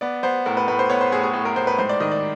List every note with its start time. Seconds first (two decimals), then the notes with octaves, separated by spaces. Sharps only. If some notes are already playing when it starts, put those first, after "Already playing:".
0.01 B3 D5
0.23 B3 C5
0.46 A2 A#4
0.57 B4
0.68 A2 B4
0.79 C5
0.90 B3 C#5
1.01 C5
1.12 A2 G#4
1.23 G#4
1.33 A2
1.45 A#4
1.56 A2 C5
1.67 B4
1.78 G#2 C5
1.89 D5
2.00 D#3 D#5
2.11 D5